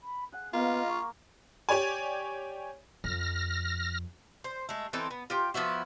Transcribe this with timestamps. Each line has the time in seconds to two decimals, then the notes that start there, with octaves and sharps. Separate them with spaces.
0.01 B5
0.32 G#4 F#5 F#6
0.53 A#3 B3 F4 D#5 G5
0.89 C#6
1.69 G4 C#5 D5 G#5
3.04 F2 F6 A#6
4.44 C5
4.69 G#3 A3
4.93 E3 C4 D#4 A4
5.11 B3
5.30 F4 G4 G5
5.54 F3 B3 E4 F#4